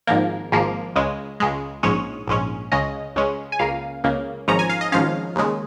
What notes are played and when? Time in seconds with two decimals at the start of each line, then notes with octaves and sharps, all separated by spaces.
0.07 G#1 G#2 F3 A#3 A#4
0.52 G#1 G#2 F3 A#3
0.96 C#2 C#3 G#3
1.40 C#2 C#3 G#3
1.83 A#1 G#2 G#3 C#4 C#5
2.28 A#1 G#2 G#3 C#4
2.72 C#2 C#3 G#3 C#4 D#5
3.15 C#2 C#3 G#3 C#4
3.52 G#5
3.59 C#2 C#3 A#3 F5
4.04 C#2 C#3 A#3
4.48 G#1 G#2 F3 C#4 A#5
4.59 G#5
4.70 F5
4.81 D#5
4.92 G#1 G#2 F3 C#4 F5
5.36 D#2 C#3 G#3